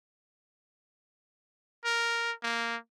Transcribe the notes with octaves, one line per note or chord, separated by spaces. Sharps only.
A#4
A#3